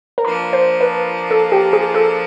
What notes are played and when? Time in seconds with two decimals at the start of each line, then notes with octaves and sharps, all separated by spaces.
0.18 A#4
0.25 F3 A#3 D4 B4
0.53 C5
0.81 B4
1.31 A4
1.52 G4
1.73 G#4
1.95 A4